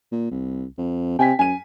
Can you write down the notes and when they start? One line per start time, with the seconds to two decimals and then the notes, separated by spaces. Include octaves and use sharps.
0.12 A#2
0.31 C2
0.78 F2
1.19 C3 G5 G#5 B6
1.39 F#2 G#5 D#7